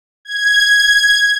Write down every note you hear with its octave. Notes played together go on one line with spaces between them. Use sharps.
G#6